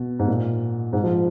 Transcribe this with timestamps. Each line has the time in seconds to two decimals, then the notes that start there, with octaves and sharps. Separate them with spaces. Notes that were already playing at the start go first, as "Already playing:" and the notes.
Already playing: B2
0.19 G#2
0.28 A#2
0.93 G#2
1.04 F3